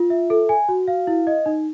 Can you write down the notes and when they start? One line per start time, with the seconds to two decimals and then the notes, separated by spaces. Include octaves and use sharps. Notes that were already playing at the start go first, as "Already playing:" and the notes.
Already playing: F4
0.10 E5
0.30 A4
0.49 G#5
0.68 F#4
0.88 F5
1.07 E4
1.27 D#5
1.46 D#4